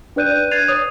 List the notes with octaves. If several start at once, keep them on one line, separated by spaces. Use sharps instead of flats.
D4 B4 D5 F#6 G6 D#7
F#6 G#6 A6 C7 D#7 F7
C#5 D#6